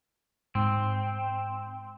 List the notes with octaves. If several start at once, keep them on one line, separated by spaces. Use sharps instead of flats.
G#2 C4